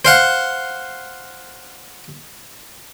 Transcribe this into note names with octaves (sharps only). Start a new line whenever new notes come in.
C5 F5 F#5